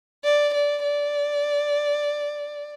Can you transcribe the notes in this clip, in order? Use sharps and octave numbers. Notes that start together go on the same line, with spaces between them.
D5
D5
D5